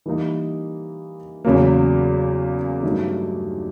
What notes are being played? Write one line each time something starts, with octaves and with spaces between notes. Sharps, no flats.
E3 G3 A#3 D#4
E2 C#3 F#3 A#3
G2 D#3 F#3 A3